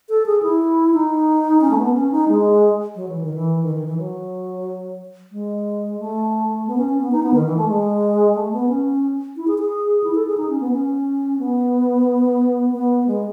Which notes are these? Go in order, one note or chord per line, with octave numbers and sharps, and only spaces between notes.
A4
G#4
E4
D#4
C#4
A3
B3
C#4
D#4
G#3
F#3
E3
D#3
E3
D#3
D#3
E3
F#3
G#3
A3
B3
C#4
C#4
B3
D#4
B3
D#3
E3
A3
G#3
A3
B3
C#4
E4
G#4
G#4
E4
A4
G#4
D#4
C#4
B3
C#4
B3
B3
G#3